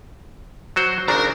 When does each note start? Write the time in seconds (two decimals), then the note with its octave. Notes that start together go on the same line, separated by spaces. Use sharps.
0.76 F#3 F#4 C5
1.08 G#1 C#3 D4 A#4 A#5